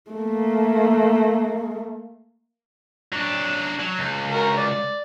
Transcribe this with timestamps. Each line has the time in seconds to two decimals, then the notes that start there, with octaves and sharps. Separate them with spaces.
0.11 A3 A#3
3.13 F#3 D4
3.80 F#3
3.99 C#2
4.31 F#4 A#4
4.57 D5